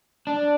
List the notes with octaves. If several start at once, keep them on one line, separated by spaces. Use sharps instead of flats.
D4